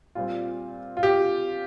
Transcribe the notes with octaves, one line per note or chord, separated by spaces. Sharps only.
A#2 G3 C4 F4
F4
G4